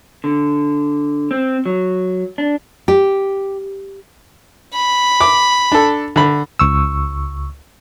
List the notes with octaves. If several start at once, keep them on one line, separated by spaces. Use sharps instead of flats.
D3
C4
F#3
D4
G4
B5
D6
D4 A4
D3 B5
C#2 C#6 E6